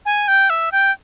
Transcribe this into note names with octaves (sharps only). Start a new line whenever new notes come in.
G#5
G5
E5
G5